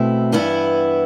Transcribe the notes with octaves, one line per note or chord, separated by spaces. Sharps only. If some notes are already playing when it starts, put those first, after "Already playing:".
Already playing: B2 A3 C4 E4
G2 E3 B3 E4